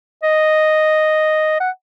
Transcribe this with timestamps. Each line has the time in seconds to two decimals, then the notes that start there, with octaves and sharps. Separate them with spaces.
0.23 D#5
1.60 F#5